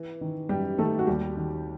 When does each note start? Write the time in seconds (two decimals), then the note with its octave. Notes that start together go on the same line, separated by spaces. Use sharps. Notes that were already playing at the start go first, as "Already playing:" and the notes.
Already playing: E3
0.21 D#3
0.49 F#2 G3 G4
0.78 D#3 A3 A4
0.99 F#4
1.07 D#2 G3 G4
1.37 D#3